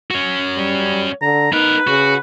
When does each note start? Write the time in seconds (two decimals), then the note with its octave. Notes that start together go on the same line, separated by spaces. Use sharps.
0.11 C#4 F#4
0.57 G3
1.22 D3 A#5
1.53 B3 D#4 A#4 B4
1.87 C#3 F#4